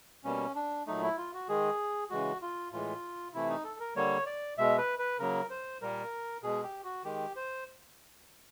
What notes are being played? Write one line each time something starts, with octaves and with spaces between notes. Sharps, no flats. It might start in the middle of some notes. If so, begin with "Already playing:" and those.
B2 G3 A#3 C#4
D4
A#2 F#3 A3 D#4
E4
F4
F#4
D#3 G#3 G#4
C#3 E3 G#3 F#4
F4
A2 E3 G#3 F4
C3 E3 A3 E4
D#4
A4
A#4
D3 G3 A#3 C#5
D5
B2 G#3 E5
B4
B4
C#3 F#3 A#3 A#4
C5
A#2 G3 A#3 A#4
B2 G#3 G#4
G4
F#4
D#3 G#3 G4
C5